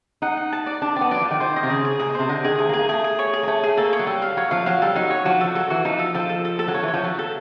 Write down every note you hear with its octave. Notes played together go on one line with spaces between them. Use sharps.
D#4 F#5
F#5
A5
D5
D4 A5
C4 D5
B3
F#3 D5
F3
D#3 D5
D#3 C5
D#5
C3
C#3 G#4
G#4
A#2 G#4
B2
C3 C5
D3 D#5
D#3 G#4
A3 G#4
A#3
G#4
A#3
A3 G#4
G#4
C#5
G#4
A#3
A3 C#5
A3 G#4
A#3 A4
C#5
F#3
G3 A4
F5
F#3 C#5
F3 F5
F#3 F5
G3 A4
F#3 D#4
C#5
F3 F#4
F3 A4
F#3 A4
E3 F#4
F3 D#4
A4
F3 A4
A4
A4
A4
F#3
F3 C#5
E3
C#5
F3
F#3 A4
A4